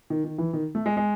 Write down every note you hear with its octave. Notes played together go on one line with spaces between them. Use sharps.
D#3
D#3
E3
D#3
A3
G#3
G#3